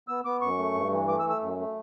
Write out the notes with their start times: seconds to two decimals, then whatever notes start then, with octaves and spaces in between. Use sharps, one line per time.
0.08 B3 E6
0.25 B3 D6
0.41 F#2 C#6
0.59 A3
0.75 G2
0.91 E3
1.08 A3 D6
1.20 E6
1.24 A3
1.30 E6
1.41 F#2
1.58 A3